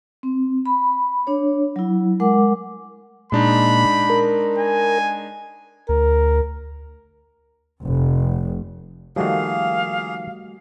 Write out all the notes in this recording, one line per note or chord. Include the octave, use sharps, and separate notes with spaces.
C4
B5
D4 C#5
F#3 E4
G#3 A#4 F#5 D6
A#2 G#3 D4 D#4 B5
A#4
G#5
D2 A#4
F1
D#3 F3 G3 A3 A#3 F#4 G#4 F5